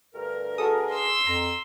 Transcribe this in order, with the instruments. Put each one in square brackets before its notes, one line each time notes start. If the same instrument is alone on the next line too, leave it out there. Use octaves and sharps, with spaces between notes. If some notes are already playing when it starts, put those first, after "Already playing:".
[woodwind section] D2 G2 A#4
[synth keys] F#4 A4 D#6 [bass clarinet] G#4
[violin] C6 E6
[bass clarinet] F2 [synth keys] A#5